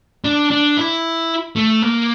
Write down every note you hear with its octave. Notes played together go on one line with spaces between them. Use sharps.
D4
D4
E4
A3
A#3